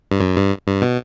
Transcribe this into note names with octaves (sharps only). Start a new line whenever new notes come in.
G2
F#2
G2
G2
B2